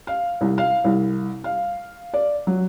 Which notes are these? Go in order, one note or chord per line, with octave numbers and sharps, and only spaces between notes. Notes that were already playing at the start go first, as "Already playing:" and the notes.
F5
C2
F5
C2
F5
D5
F#3